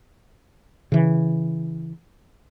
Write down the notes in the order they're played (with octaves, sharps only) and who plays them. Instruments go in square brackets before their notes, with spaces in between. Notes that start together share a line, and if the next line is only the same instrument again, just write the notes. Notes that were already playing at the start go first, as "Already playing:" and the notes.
[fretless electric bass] C#3 E3